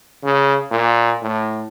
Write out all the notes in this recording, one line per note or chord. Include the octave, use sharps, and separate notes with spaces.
C#3
A#2
A2